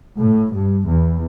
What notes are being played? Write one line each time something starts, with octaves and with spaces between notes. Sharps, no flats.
A2
G2
E2